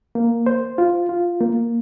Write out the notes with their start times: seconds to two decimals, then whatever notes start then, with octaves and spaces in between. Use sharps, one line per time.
0.15 A#3
0.46 C5
0.78 F4
1.09 F4
1.40 A#3